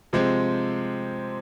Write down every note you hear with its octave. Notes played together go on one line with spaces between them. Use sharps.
C3 F3 G#3 C4